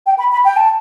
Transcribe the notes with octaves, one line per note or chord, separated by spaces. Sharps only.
G5
B5
B5
G5
A5